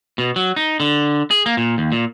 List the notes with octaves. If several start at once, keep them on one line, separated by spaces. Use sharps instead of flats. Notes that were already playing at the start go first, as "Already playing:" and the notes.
B2
F#3
D#4
D3
G#4
A#3
A#2
D#2
A#2